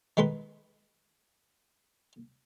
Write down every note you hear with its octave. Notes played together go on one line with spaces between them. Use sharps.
D#3 G#3 B4 C6